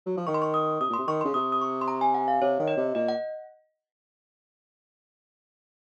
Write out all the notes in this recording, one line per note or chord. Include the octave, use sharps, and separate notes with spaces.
F#3
F3
D#3 C#6
C6
C#6
D#6
C3 D#6
A#2 C6
C3
D#3 C#6
C6
C#3
C3 D#6
D#6
C#6
C6
A#5
G#5
F#5
F5
C3 C#5
D#3
D#5
C3
A#2 D#5
F#5